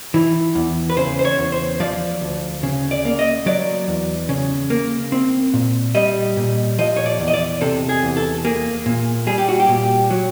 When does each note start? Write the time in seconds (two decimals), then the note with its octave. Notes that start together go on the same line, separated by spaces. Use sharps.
0.14 E3
0.55 E2
0.90 B4
0.97 C#3 C5
1.19 C5
1.25 C#5
1.38 E2
1.52 C5
1.80 F3 D5
2.21 D2
2.63 C#3
2.91 D5
3.05 A#3
3.19 D#5
3.46 F#3 D5
3.88 E2
4.29 C#3
4.70 A#3
5.12 C4
5.54 A#2
5.95 G3 D#5
6.37 A#2
6.79 F3 D#5
6.97 C#5
7.06 D5
7.20 E2
7.28 D#5
7.34 D5
7.61 C3 A4
7.89 G#4
8.03 E2
8.17 A4
8.45 A#3 G#4
8.86 A#2
9.27 G3 G#4
9.38 G4
9.49 F#4
9.60 G4
9.69 A#2
10.10 F#3